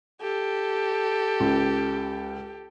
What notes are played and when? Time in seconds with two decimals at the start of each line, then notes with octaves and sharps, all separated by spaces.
0.21 G4 A4
1.40 C#2